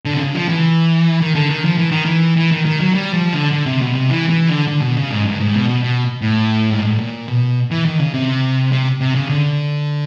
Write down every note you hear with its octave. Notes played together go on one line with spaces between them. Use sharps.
D3
C3
C#3
F3
E3
D#3
D3
D#3
F3
E3
D#3
E3
E3
D#3
D#3
F#3
G3
F3
D3
D3
C3
B2
C3
E3
E3
D3
D3
B2
C#3
G#2
G2
G#2
B2
B2
B2
A2
G#2
A2
A#2
B2
E3
D#3
C#3
C3
C3
C3
C#3
D3